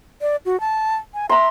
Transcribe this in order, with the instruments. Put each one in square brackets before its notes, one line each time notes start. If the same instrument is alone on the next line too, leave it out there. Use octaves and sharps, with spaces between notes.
[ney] D5
F#4
A5
G#5
[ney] E5 [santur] A#5 C6